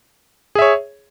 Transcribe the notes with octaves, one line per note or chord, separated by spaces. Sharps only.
G#4 C#5 E5